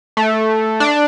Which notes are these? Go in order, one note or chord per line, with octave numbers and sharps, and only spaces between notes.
A3
D4